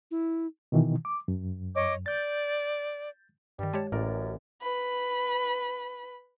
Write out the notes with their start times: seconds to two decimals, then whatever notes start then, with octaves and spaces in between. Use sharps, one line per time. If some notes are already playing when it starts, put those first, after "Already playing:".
0.11 E4
0.72 B2 D#3 E3
1.05 D6
1.28 F#2
1.75 C#5 D#5 D6
2.06 D5 G6 A6
3.59 G2 D#3 G3
3.73 G#3 G4 C#5 A5
3.92 A1 F#2 A2 A#4 D5
4.62 B4 B5